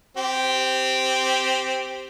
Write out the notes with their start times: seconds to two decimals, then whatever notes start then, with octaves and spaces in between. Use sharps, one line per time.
0.17 C4 G4